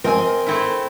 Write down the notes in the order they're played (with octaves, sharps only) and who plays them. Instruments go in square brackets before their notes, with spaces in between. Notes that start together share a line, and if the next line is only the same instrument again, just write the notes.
[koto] C4 [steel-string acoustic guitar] A#4 D#5 G#5
[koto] A3 C4 E4